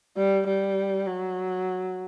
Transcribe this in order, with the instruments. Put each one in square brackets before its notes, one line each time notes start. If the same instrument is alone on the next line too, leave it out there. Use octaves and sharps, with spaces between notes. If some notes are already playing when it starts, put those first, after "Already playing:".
[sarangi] G3
G3
F#3